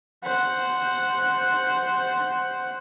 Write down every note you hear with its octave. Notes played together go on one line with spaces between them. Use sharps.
C5 F#5